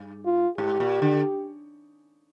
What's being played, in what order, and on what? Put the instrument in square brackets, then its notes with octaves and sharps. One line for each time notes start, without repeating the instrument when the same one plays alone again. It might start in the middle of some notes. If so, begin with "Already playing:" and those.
Already playing: [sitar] G2
[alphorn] F4
[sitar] G#2 [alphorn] G4
[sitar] A#2
D3